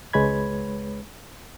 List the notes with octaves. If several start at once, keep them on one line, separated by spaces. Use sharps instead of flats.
C#2 G#3 B4 C#5 B5 G#6